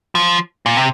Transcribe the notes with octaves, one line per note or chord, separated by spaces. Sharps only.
F3
A#2
C3